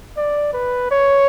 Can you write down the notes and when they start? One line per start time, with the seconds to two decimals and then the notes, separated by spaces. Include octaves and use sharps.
0.17 D5
0.53 B4
0.91 C#5